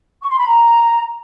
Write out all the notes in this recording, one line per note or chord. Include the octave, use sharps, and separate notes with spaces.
C#6
C6
B5
A#5